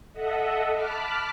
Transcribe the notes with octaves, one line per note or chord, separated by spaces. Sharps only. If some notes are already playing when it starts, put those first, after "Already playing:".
A4 D#5 E5 F#5
A5 B5 D6 F6 F#6 B6